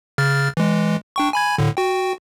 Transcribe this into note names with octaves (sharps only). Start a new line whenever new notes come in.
C#3 F6 A6
E3 G#3
D4 G5 C#6
G#5 B5 G#6
A2 D3
F#4 G5